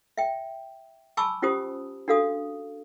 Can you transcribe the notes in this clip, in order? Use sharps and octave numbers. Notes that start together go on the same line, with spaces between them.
E5 G5
G#5 A5 B5 C#6 D6 E6
C#4 F4 G4 C5 D#6
D4 F#4 A4 F5 D#6